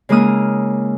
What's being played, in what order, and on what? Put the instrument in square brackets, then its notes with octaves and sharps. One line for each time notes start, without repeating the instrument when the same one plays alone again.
[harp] C#3 G#3 A#3 E4 D#6 F6